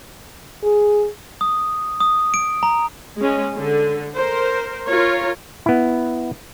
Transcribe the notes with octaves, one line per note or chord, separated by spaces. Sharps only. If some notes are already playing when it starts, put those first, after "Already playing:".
G#4
D#6
D#6
D7
A#5
G#3 C#4
D3
A#4 C5
F4 A#4 C#5
B3 E4